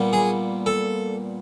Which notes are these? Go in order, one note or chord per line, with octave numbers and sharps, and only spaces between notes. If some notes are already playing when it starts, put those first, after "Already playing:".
Already playing: A#2 G3 B3
G#4
A4